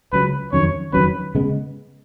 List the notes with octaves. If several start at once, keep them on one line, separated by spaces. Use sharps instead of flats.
C#2 C#3 F#3 B4
F2 D#3 F#3 C#4 C#5
F2 D#3 F#3 C#4 B4
C#3 G#3 B3